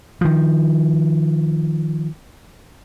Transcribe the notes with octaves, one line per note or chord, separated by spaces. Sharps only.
D#3 F3